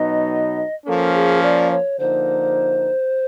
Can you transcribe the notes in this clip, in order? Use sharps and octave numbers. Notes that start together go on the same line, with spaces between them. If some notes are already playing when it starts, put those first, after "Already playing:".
Already playing: B2 F#3 B3 D#4 D#5
F3 A#3 C#4 A4
G#4
D5
C#5
D3 F3 A#3 D#4 C5